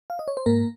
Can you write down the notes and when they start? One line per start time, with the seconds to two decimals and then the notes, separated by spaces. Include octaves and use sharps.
0.10 F5
0.19 D#5
0.28 C#5
0.37 C5
0.46 G#2 A#3 A#4